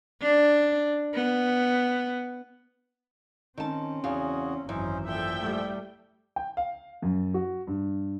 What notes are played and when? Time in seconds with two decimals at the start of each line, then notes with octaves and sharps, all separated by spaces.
0.22 D4
1.14 B3
3.58 D#3 C4 C#4 A5
4.04 E2 C#3 F#4 G#4 F5
4.69 G#1 F#2 E3 C#4 D#4 C5
5.06 A#2 F3 A4 E5 G5
5.41 G3 A3
6.36 G5
6.57 F5
7.02 F#2
7.34 F#4
7.67 G2